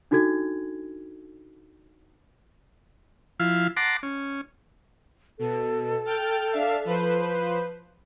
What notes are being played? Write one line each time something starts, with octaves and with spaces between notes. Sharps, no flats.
D4 D#4 F#4 A4 G#6
F3 E4 F5
F#5 A5 A#5 C6 D6
C#4
B2 A4
G5 F6 A6
D4 E5 F5
F3 B4 C5